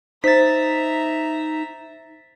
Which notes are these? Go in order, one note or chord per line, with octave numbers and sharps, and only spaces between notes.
D#4 C5 E5 A#5 A6 B6